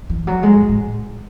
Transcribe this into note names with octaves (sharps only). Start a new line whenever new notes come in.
E3
F#3
G#3
A2
A2